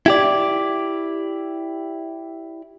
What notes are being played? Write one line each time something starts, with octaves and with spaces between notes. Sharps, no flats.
E4 G4 D5